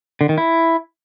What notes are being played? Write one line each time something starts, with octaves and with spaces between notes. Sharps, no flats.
D3
D#3
E4